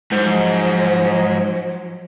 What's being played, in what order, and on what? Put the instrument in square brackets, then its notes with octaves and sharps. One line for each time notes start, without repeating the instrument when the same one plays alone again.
[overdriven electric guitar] G#2 [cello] F3 F#3 [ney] C5